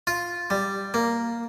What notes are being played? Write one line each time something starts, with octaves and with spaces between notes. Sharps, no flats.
F4
G3
A#3